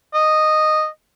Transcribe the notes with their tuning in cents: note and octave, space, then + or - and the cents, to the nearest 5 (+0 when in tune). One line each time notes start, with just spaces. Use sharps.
D#5 -10